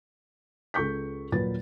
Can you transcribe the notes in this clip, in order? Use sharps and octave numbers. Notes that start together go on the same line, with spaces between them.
C#2 A4 C#6 G6 B6
D#1 A#2 F#3 B4 A6